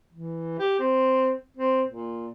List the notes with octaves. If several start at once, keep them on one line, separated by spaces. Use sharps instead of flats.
E3
G4
C4
C4
A#2